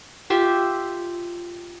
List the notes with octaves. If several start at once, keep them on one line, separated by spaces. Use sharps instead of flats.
F4 G4 E5